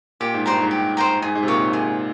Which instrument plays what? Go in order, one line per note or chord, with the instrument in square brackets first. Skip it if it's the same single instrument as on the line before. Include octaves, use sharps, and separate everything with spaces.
[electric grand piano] A#2 [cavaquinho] G4
[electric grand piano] G#2
[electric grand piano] G2 [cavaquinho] C5 G5 A#5
[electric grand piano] G#2
[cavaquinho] G4
C5 G5 A#5
[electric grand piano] G#2 [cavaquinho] G#4
[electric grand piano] G#2
C3
[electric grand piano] A#2 [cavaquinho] C#5 F5
[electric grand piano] G#2
[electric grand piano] A#2 [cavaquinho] G#4